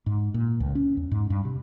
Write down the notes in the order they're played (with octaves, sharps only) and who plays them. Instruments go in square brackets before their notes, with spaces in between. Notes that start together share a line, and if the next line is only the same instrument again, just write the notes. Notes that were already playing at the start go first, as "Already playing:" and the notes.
[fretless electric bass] G#2
A#2
C#2
C#4
E2
G#2
G2
C3